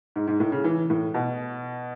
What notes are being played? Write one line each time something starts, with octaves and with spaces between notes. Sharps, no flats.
G#2
G#2
A2
C#3
E3
A2
B2